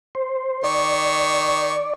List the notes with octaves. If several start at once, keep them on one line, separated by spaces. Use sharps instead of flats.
C5
D#3 D5 C#6